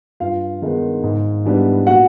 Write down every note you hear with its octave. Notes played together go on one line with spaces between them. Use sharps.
G2 F4 F5
D#3 G#3 B3 D#4
G#2
E3 G3 B3 D4
A#2 F#4 F#5